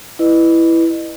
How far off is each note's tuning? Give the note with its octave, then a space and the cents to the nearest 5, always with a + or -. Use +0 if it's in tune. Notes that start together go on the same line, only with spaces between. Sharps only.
E4 +5 B4 +0 D#5 -30